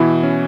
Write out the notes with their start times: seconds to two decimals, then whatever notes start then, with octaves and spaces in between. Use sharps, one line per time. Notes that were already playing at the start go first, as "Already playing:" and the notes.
Already playing: B2 E3 E4
0.23 C#4